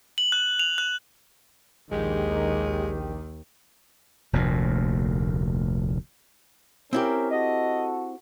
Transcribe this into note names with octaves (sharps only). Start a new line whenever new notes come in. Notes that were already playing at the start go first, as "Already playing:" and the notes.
F#7
F#6
F7
F#6
A#1 D#2 D#3 G#3 G4
F1 D2 A#2
C4 C#4 E4 G4 A#4
F#4 A4 D#5